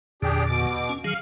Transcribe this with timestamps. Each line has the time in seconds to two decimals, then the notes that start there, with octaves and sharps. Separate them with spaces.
0.22 E2 A#2 D3 D4 G4 G#4
0.47 B2 D6
0.89 C#4
1.04 D#3 F#3 G#4 F5